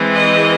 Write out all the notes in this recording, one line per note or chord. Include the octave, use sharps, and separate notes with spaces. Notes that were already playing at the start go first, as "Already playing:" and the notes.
Already playing: E3 G#3 C4
D#5